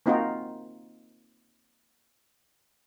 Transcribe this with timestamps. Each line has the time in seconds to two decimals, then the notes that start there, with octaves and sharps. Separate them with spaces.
0.06 A#3 C4 D#4 F4 F#4 A#4